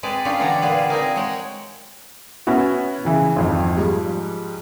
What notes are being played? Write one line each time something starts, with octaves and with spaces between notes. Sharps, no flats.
G#3 C4 G#4 B4 D5
C#4 D4 F4 G4 G#4 C#5
D3 E3 G3 B3 D5 A#5
A#2 G3 F4 G#4 B4
C4 D#4 G#4 A#4
G#3 C#5 F#5 G5
B3 C#4 E4 F#4
C#3 E3
G#1 F2
G#2 F3 G3